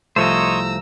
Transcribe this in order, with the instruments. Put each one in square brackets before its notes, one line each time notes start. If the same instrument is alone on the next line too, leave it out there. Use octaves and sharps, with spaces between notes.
[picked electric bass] C2 [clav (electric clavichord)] F3 A3 [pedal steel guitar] C5 C#5 D#5 [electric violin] A#5 E6